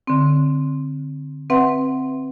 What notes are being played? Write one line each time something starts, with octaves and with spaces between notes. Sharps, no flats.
D3 C4
C4 B4 E5 F#5